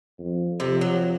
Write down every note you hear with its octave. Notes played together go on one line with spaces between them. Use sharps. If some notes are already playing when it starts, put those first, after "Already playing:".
F2
F2 C3
F#3